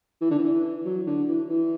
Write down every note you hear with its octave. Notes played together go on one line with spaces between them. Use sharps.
E3
D3
E3
F#3
D3
E3
E3